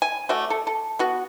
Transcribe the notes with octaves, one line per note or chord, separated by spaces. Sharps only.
G#5
A3 F#4 D5
A4
A4
B3 F#4